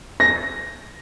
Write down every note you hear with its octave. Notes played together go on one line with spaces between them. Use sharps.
A#6